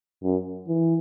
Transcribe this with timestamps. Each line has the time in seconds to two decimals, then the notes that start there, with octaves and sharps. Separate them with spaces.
0.23 F#2
0.68 E3